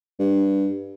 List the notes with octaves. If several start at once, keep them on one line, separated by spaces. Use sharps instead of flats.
G2